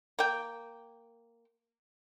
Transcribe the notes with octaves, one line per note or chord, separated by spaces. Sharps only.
A#3 G5